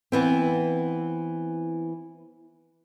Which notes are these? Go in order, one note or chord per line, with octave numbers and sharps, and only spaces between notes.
E3 B3 C4